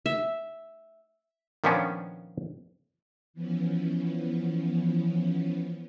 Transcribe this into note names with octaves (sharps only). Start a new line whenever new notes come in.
E5
A#2 D#3 F3 B3 C#4 D4
E3 F3 B3 C#4